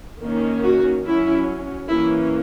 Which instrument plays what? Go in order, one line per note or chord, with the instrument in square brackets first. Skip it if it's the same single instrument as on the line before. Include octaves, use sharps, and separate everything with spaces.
[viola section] D#3 A#3 C#4
F#4
F#3 C#4 E4
E3 A#3 C#4 E4